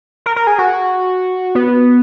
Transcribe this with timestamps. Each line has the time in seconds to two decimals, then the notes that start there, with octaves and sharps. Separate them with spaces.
0.26 A#4
0.36 A#4
0.47 G#4
0.58 F#4
1.55 B3